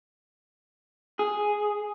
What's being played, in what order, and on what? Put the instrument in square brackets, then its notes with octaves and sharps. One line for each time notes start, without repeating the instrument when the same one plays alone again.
[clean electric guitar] G#4